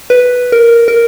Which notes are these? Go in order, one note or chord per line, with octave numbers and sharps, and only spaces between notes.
B4
A#4
A#4